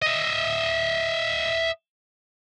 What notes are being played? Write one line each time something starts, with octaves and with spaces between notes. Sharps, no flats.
D#5 E5